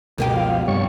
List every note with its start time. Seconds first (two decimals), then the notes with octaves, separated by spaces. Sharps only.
0.18 F#1 C#2 B2 A#3 G4
0.34 F3 F5
0.68 F1 G2 G3 C#5 C#6